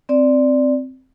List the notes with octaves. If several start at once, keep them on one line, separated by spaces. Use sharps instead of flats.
C4 D5